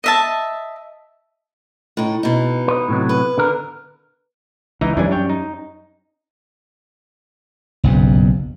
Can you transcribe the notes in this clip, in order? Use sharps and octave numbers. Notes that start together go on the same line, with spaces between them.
D#5 E5 A5
A2 D#4
B2 D#4
B4 D#5
A2 C3 F#3
B4
D3 A#4
C#2 E3 D#4 A#5
F#2 E3 G3 C#4 D4 G#5
D4 C#5 G5
D#4
F#1 B1 G2